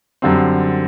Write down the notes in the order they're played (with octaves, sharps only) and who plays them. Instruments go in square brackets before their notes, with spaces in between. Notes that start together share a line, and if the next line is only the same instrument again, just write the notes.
[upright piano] F#2 D3 G3 C4